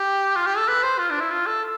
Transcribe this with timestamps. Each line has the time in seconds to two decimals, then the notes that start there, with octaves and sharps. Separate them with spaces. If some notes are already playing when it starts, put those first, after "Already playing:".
Already playing: G4
0.36 F4
0.47 G4
0.58 A4
0.68 B4
0.83 C5
0.99 F4
1.10 D4
1.20 E4
1.31 F4
1.46 A4